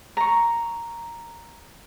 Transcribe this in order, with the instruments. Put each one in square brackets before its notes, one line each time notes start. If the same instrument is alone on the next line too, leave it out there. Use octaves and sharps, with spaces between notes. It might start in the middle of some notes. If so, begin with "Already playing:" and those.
[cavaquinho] A#5 C#6